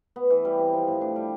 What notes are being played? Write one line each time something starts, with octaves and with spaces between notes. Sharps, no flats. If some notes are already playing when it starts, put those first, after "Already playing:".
B3
E3
G3
C3
F3
A2
D4
G3